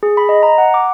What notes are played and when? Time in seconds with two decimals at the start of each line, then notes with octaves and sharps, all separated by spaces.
0.03 G#4
0.17 B5
0.29 D#5
0.43 A#5
0.58 F#5
0.74 D6